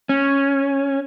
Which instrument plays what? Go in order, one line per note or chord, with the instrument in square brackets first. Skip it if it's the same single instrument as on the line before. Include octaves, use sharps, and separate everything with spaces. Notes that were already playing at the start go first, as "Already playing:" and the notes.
[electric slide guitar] C#4